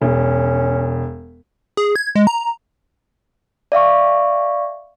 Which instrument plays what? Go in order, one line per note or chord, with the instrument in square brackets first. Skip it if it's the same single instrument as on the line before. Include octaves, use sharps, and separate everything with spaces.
[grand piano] E1 [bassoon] C#4
[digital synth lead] G#4
G#6
G#3
A#5
[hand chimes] D5 E5 F5 C#6